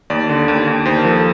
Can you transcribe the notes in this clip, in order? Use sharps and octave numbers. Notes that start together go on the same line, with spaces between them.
D#2 D5
D3
D#2
D#2
D#2 C5
A#4
F3
A4